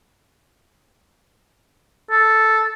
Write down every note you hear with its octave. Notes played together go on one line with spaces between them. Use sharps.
A4